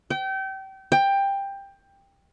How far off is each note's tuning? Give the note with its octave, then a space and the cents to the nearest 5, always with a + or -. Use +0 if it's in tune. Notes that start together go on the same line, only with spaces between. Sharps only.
G5 -30
G5 +15